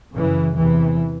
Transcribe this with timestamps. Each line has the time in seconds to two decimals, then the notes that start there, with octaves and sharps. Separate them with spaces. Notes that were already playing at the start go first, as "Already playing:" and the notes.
0.15 F#2 C#3 E3
0.55 E2 C3 E3